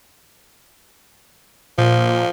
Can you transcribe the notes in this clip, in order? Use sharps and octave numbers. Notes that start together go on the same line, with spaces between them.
A#2 F3